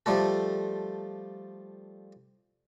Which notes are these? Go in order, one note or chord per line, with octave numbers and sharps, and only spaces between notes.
F3 G3 A3 A4